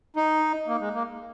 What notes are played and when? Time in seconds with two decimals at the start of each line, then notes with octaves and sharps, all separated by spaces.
0.16 D#4
0.68 A#3
0.80 G#3
0.94 A#3